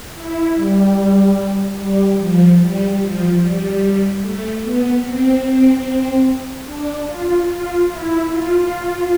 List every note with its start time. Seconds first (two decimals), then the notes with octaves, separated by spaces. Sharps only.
0.14 E4
0.55 G3
1.77 G3
2.18 F3
2.59 G3
3.00 F3
3.41 G3
4.22 A3
4.62 B3
5.03 C4
6.66 D4
7.07 F4
7.48 F4
7.89 E4
8.29 F4